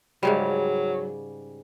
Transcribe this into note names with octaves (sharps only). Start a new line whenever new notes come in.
G#2 C#3 F#3 G3